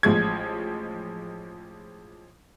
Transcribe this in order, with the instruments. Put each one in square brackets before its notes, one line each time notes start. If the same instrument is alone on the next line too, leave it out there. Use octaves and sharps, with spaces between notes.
[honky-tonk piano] A1 F3 G#3 G#6